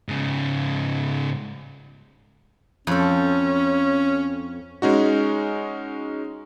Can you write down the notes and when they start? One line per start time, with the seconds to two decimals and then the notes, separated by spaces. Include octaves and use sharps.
0.08 G#2 C#3
2.87 F2 C#4 A4
4.82 G#3 C#4 D#4 F#4